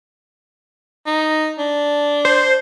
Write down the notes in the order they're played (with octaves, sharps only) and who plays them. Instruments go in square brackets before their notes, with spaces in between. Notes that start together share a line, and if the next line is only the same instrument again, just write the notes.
[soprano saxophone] D#4
D4
[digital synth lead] C5